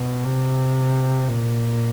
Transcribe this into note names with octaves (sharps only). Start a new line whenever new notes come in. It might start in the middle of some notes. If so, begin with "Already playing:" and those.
Already playing: B2
C3
A#2